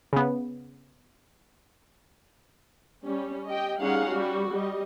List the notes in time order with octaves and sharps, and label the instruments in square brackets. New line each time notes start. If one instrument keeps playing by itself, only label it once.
[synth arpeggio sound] C#3 B3
[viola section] G3 C#4
G4 D#5 G5
G3 C#4 D#4 G#4 F5 F#5
G3 F#4
G3 D#5